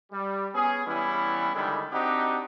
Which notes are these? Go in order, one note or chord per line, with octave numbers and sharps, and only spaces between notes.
G3
B3 C#4 G#4
E3 G3 B3 C#4 E4
D3 D#3 G3 G#3 E4
C4 D4 D#4 F#4 G4